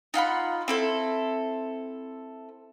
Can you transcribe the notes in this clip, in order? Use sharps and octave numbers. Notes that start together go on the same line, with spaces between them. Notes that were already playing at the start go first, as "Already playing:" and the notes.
D#4 F4 F#5 B5
C4 E4 A4